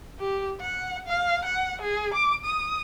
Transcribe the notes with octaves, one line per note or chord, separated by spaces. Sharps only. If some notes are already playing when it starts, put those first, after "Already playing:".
G4
F#5
F5
F#5
G#4
D6
D#6